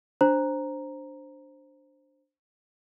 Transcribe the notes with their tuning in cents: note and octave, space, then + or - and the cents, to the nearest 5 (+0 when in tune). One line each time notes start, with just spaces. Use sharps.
D4 +0 C5 +5 A#5 +0